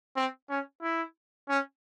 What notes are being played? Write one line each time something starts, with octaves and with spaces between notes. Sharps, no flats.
C4
C#4
E4
C#4